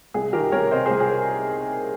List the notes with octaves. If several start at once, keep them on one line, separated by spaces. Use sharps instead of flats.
C2 G#4
D#3 G4 A#4
C2 A#4 C#5
C3 C5 D#5
C2 G#4 C5
G#4 C5